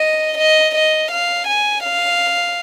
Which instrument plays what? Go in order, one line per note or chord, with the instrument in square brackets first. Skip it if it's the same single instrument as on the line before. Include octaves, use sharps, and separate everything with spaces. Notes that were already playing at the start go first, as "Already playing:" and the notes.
Already playing: [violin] D#5
D#5
D#5
F5
G#5
F5